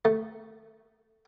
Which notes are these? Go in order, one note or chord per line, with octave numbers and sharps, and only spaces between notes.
A3